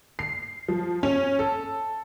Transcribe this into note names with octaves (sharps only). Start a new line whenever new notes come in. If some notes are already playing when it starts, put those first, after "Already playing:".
C7
F3
C#4
A4